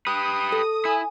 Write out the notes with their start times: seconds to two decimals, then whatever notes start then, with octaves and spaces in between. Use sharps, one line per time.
0.07 G4 B4 D#6
0.52 A4
0.85 E4 G#5